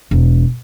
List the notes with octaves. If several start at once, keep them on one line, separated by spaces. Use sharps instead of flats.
E1